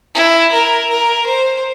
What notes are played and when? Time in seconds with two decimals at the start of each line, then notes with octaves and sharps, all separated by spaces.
0.15 E4
0.52 A#4
0.89 A#4
1.26 C5